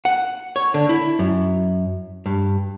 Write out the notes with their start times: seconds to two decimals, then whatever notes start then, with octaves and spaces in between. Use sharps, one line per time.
0.05 F#5
0.56 C#5
0.74 D3
0.89 E4
1.19 F#2
2.26 G2